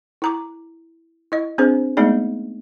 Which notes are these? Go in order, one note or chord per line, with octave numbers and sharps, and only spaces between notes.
E4 A#5 D6
E4 D#5
C4 D4 G#4 C5
G#3 A3 B3 D#4 G#4 D5